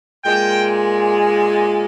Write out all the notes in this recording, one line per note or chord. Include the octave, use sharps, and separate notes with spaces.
A#2 G#3 G5